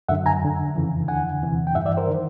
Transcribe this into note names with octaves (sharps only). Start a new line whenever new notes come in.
F#2 D3 E5 F#5
G#5 A#5
F2 D3
F2 C#3 E3
D#2 D3 F#5 G#5
E2 C3 E3
G5
G2 E3 E5 F#5
D5 E5
A#4 C5
D#3